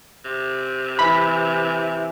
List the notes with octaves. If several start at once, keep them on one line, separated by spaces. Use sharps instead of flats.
C3
E3 B5 B6